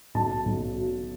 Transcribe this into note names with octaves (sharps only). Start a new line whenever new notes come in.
B1 A5
B1
F#3